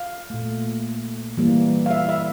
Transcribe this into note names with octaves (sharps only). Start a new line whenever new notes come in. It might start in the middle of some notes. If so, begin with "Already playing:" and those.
Already playing: F5
A#2 A3
E3 G3 A#3
F5
E5
E5